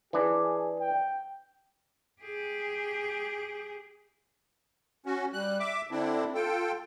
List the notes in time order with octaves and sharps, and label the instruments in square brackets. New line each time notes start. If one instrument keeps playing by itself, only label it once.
[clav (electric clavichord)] E3 D4 [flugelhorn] G#4
[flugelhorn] G5
[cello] G4 G#4
[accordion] C#4 F#4
G3 F#6
E5 D6
D3 C4 D4 E4
F4 A4 G5